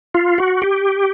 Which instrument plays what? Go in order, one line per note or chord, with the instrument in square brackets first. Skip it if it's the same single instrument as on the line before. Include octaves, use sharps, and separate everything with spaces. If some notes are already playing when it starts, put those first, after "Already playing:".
[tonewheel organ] F4
F#4
G4